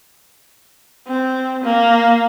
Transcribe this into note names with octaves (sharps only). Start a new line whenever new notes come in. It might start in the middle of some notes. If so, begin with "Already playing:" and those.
C4
A#3